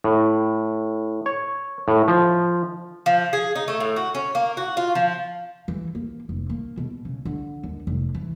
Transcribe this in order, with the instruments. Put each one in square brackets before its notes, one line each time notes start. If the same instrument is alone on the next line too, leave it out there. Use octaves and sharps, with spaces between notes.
[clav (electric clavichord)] A2
C#5
A2
F3
[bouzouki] F3
G#4
D#4
A3
A2
F#4
C#4
A#3
F#4
F4
F3
[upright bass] E3
A#3
F1
A#3
B2
C#3
D3
D#2
F1
E3